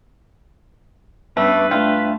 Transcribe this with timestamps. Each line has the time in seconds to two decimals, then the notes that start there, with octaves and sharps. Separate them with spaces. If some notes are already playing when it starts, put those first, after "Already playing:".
1.37 G2 G3 A3 B3 C#4 B4
1.71 A3 D4 F4 E5 G5